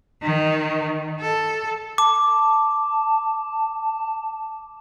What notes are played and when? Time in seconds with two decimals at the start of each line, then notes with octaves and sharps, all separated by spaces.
0.22 D#3
1.21 A4
1.98 A5 D6